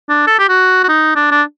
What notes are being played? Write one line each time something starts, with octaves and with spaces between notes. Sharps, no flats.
D4
A4
G4
F#4
F#4
D#4
D4
D4